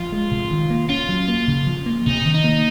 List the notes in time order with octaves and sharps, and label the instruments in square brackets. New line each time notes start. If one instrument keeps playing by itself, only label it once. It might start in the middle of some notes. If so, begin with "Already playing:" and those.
Already playing: [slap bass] F3 [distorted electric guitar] F4
[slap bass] G#3
C3
D#3
A#3
[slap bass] C#4 [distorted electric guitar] F4
[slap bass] F#3
A#3
C#3
F3
A#3
[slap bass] C3 [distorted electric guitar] D#4
[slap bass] D#3
[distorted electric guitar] D#4
[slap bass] A#3